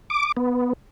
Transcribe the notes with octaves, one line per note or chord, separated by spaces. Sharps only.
D6
B3